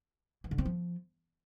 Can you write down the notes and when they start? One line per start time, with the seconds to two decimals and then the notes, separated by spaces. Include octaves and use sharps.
0.44 E3
0.51 D3
0.58 C4
0.65 F3